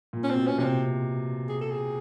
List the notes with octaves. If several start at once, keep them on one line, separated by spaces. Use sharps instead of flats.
A#2
C#4
C4
B2
C#4
C3 C#4
C4
G#4
A4
G#4